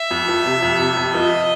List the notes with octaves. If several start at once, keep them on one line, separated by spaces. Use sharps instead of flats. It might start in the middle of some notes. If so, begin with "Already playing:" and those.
Already playing: E5
F2
F3
C3
F2
C3
F2
F3 D#5